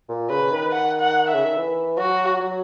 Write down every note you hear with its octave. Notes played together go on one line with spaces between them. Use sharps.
A#2
C#3 B4
D#3
F#5
F#5
E5
C#3
D#3
E3
F#3 F#4
F#3